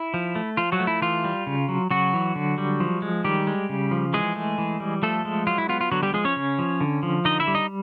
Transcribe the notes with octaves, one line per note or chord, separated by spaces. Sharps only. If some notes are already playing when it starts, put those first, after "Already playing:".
Already playing: E4
F3
A3
F3 F4
F#3 F#4
A3
E4
E3 F4
G3
C#3
F#3
C#3 F#3 F#4
E3
D3
G3
F3
G#3
D#3 G3 G4
G#3
C#3
F3
E3 G#3 G#4
A3
E3
G3
F3 A3 A4
G#3
F#3 F4
E4
B3 F4
F4
D3 F#3 F#4
G3 G4
F3 G#3 G#4
C#4 C#5
C#3
F3
D3
F3
D3 D#4 D#5
E4 E5
G3
D#4 D#5